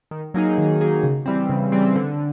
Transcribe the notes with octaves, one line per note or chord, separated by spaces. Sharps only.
D#3
F#3 A#3 D#4 G#4
D#3
F#3 A#3 D#4 G#4
C#3
E3 G3 C4
C#3
E3 G3 C4
D3